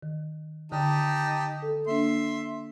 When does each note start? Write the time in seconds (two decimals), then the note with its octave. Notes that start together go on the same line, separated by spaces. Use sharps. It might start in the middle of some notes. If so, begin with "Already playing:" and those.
0.03 D#3
0.72 D3 D#4 G4 G5 A5
1.62 A4
1.87 A#3 D4 E5 C6